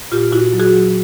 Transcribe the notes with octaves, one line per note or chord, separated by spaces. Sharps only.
A#2 F4 G4
A#2 E4 F#4
F#3
F#4 G#4
F#3